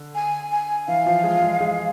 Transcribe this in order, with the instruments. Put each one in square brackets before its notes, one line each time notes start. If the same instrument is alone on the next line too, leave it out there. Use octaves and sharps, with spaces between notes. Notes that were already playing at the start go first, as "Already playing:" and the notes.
Already playing: [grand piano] D3
[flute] G#5
G#5
[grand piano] E3 E4 [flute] F5
[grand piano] F3 F4
G#3 G#4
G#3 G#4
G#3 G#4